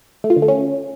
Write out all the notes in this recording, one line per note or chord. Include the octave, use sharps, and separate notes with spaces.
A3
F4
D3
A3
C#4